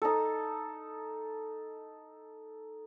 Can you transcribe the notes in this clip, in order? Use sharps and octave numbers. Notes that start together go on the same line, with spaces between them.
D#4 A4